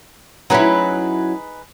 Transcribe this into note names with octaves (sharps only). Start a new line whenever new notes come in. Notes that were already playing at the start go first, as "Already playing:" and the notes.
F#3 C#4 D#4 E4 G#4 B4